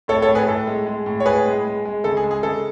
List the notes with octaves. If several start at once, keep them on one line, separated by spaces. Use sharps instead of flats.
A2 A4 C#5
A4 C#5
A2
G#4 B4
A2 A4
G#3
G#3
A2
C#5
A2 G#4 B4
G#3
G#3
G#3
C#3 A4
G#4
G#3
G#4
C#3 A4